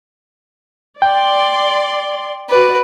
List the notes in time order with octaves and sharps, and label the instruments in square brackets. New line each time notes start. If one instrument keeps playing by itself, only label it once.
[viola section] D5 C6 [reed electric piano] G5
[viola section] F#4 D5 [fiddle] B4